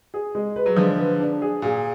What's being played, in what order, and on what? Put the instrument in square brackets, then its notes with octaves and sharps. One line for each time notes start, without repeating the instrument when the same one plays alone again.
[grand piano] G#4
G#3
B4
[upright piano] F#3
[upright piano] D3 F3 [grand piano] G#3
[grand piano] B4
D4
G#4
[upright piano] A#2 [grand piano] G#4